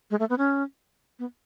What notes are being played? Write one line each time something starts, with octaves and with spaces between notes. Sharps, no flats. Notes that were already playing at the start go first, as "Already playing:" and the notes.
G#3
A3
B3
C#4
B3